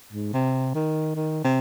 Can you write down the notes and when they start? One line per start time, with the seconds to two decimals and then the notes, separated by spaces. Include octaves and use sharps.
0.12 G#2
0.33 C3
0.75 D#3
1.16 D#3
1.44 C3